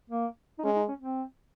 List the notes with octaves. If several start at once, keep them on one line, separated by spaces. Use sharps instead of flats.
A#3
D#4
G#3 C#4
D#4
C#4
C4